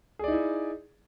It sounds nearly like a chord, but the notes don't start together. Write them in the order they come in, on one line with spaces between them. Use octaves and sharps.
G#4 D5 D#4 E4